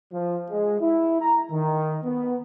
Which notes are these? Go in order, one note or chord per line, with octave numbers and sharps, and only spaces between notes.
F3
G#3
E4
A#5
D#3
B3